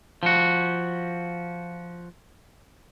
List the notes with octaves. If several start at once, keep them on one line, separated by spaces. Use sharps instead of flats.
F3 F#4